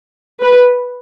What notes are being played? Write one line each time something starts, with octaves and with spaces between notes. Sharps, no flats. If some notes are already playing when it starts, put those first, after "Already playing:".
B4